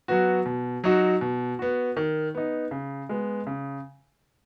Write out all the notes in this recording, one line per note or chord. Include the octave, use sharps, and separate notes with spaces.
F#3 B3 F#4
B2
F#3 D#4 F#4
B2
B3 F#4
D#3
B3 D#4
C#3
G#3 B3
C#3